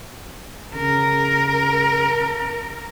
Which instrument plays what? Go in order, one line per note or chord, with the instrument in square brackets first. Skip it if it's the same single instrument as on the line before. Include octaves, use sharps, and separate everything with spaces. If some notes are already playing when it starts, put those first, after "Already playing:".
[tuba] C#3 [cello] A#4